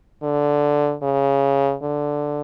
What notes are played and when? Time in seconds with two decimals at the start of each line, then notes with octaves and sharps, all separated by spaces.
0.23 D3
1.03 C#3
1.82 D3